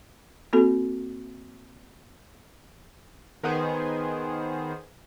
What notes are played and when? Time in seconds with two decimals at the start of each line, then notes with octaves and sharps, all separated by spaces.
0.53 A#3 C4 F#4 A4
3.43 D#3 B3 G#4 C5